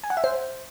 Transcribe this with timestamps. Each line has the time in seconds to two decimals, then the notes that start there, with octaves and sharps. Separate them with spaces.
0.04 G#5
0.10 F#5
0.17 E5
0.24 C5